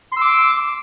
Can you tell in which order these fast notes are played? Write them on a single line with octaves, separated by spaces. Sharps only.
C6 E6 D6